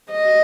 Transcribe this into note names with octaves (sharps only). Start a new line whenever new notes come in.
D#5